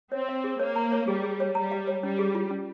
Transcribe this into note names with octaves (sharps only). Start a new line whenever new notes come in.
C4 C#5
F5
G#4
A#3 C#5
A#5
C#5
G3 G#4
G#4
C#5
G3 A#5
F5
C#5
G3 C#4
G#4
F4
C#4